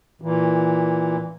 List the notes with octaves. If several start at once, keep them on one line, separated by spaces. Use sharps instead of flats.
A#2 E3